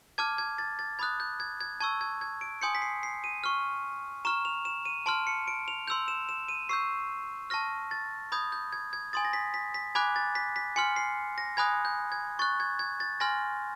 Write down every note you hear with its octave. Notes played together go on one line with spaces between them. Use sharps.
A5 D6 F6 G#6
G#6
A6
A6
B5 D#6 F#6 G#6
G6
G#6
G#6
A5 C#6 E6 G#6
G#6
G#6
D7
G#5 C6 D#6 G6 C#7
B6
C7
C7
D#7
C#6 F6
A#5 C#6 F6 E7
F7
E7
D#7
A5 C6 F6 D7
C#7
D7
F7
C6 E6 G6 F7
E7
E7
D#7
C#6 E6 G6 C7
A5 C#6 F6 A#6
A6
B5 D#6 G6 G#6
G6
G#6
G#6
G#5 C6 D#6 A6
A#6
B6
B6
B6
G#5 B5 D6 F#6 G#6
A6
B6
B6
G#5 C6 F6 C#7
C7
A#6
G#5 B5 D#6 F#6 G#6
G6
G#6
C#6 F#6 A6
G#6
G#6
A6
G#5 C6 F6 A#6